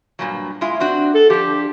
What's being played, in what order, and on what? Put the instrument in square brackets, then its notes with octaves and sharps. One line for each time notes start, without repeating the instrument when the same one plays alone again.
[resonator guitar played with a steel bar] G2 A#2 F#3
G#3 E4 F4
C4 D4 F#4
[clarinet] A4
[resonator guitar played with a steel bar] F3 D4 [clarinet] G4